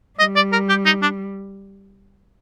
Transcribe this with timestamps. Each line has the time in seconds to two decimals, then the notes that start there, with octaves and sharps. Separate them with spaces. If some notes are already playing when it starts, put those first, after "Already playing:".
0.19 G3 D#5
0.36 D5
0.52 A#4
0.69 G4
0.85 D#4
1.02 D4